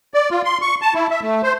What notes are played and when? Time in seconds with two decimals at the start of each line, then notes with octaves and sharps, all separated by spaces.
0.14 D5
0.30 F4
0.45 C6
0.62 C#6
0.82 A5
0.94 E4
1.11 E5
1.22 A3
1.43 C5